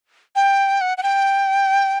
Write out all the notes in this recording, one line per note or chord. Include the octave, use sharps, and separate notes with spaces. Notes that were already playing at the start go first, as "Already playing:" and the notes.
G5
F#5
F#5
G5